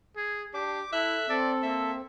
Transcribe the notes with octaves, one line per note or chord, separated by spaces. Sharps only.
G#4
D4 G4 D6
E4 A4 E5 F#6
C4 A4 D5
A#3 E5